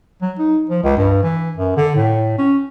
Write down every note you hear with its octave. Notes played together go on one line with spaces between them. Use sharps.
F#3
D#4
F3
C#2
G2
E3
F#2
D3
A2
C#4